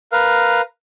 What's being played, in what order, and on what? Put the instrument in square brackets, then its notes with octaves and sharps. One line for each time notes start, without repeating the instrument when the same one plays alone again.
[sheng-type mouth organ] A#4 B4 F5 F6